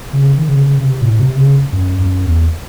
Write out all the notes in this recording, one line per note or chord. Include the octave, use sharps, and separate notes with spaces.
C#3
D#3
C#3
C#3
C#3
C3
A2
C3
C#3
F#2
F#2
E2